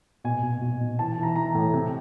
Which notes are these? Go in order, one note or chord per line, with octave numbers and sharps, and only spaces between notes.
B2 G#5
B2
B2
B2
E3 A5
E3
A#5
E3 A#5
A2
C3